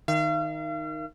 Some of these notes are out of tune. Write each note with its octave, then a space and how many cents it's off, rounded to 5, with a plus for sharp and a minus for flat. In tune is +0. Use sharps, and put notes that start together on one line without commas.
D#3 +0 F5 -40